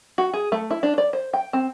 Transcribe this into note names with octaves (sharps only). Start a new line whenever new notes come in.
F#4
G#4
A3
E4
D4
D5
C5
G5
C4